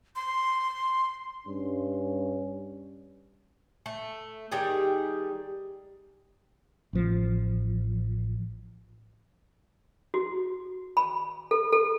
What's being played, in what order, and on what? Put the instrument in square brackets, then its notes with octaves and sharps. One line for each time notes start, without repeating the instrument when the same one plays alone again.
[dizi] C6
[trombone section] G2 C#4
[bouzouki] A3
D#3 G3 G4 G#4
[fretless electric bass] A1 F3
[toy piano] F#4
B5
A4
A4